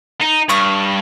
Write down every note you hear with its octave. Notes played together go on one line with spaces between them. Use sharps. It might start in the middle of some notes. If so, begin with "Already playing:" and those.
D#4
G2 C#6 D#6 F6